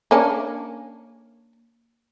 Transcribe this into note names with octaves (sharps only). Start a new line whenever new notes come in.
A#3 C#4 D4